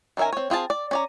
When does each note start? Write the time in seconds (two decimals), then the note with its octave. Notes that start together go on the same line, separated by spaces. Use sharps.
0.17 D#3 C#4 A#4 E5 G#5
0.32 C4 C#5
0.50 C4 F4 G#4 A5
0.70 D5
0.91 C#4 D5 A#5